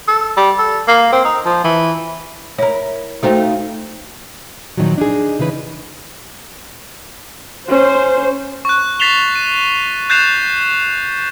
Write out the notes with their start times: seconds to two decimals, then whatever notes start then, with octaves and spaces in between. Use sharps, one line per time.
0.08 A4
0.37 G3
0.59 A4
0.88 A#3
1.12 C4
1.25 D#4
1.45 F3
1.64 E3
2.58 E4 A#4 C#5
3.23 A3 D#4 F4 F#4 C5 G5
4.77 A#2 D#3 F3 F#3
4.98 D4 D#4 G#4
5.39 C#3 E3 D#4 B4
7.69 C#4 C5
8.65 C#6 F#6
9.00 A6 B6 C7 E7 F7 G7
9.35 D#7
10.10 F#6 G6 A6 C7 E7 F7